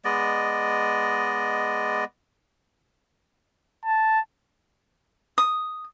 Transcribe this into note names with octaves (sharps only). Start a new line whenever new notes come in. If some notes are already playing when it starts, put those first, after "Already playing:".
G#3 B3 D5 D#5
A5
D#6